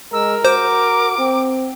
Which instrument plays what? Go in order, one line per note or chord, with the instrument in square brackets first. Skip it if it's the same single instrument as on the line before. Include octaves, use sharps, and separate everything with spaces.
[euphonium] G#3 [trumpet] A#4 [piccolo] E6
[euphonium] F#4 [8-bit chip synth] C5 [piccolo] D6
[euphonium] C4